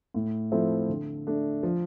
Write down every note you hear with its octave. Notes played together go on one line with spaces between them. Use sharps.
A2
F3 A3 C4 E4
D3
A3 D4
F3